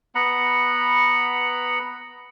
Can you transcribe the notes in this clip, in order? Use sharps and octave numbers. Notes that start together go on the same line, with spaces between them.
B3 F#5 A#5 B5